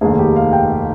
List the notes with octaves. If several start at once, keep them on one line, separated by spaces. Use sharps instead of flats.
F1 D#2 D#3 G#4
G4
F5
G5
F5